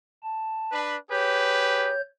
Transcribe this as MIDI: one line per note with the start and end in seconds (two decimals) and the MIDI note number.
0.23 0.80 81
0.72 0.96 62
0.72 0.96 71
1.10 1.94 67
1.10 1.94 68
1.10 1.94 71
1.10 2.01 73
1.10 2.01 91